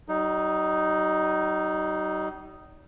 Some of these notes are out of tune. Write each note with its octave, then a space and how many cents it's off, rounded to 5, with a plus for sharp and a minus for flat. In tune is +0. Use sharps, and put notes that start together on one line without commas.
G3 -45 D#4 +0